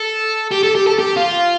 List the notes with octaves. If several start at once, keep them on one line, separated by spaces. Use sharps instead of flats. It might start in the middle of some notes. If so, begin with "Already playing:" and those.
Already playing: A4
G4
A4
G4
A4
G4
F4